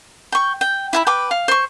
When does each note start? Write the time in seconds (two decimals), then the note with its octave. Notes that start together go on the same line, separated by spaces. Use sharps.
0.32 G5 C#6
0.61 G5
0.93 E4 E5 B5
1.07 B4 G5 D6
1.31 F5
1.48 C5 C#6